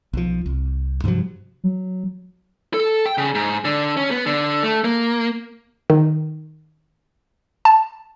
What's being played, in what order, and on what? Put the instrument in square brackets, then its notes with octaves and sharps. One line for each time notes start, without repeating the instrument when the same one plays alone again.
[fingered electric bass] B1 F3
C2
G2 C3 F3 F#3
[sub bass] F#3
[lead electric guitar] A4
G5
C#3
G#2
D3
C#4
B3
D3
A3
A#3
[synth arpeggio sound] D#3
A5